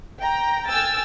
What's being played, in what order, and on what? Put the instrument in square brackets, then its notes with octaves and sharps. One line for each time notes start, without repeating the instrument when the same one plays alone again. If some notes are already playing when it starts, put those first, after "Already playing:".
[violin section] G5 A#5
G5 G#5 E6 F6 A6